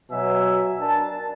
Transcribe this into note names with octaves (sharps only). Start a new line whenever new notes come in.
B2 F#3 E5 G#5
D4 A#4 A5